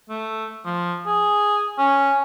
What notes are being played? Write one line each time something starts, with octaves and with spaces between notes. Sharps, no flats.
A3
F3
G#4
C#4 G#5